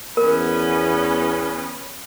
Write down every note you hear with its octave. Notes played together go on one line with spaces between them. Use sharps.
E2 B3 C#4 A#4